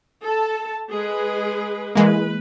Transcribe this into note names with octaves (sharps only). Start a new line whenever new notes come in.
A4 A5
G#3 G#4 B4
E3 G#3 A#3 B4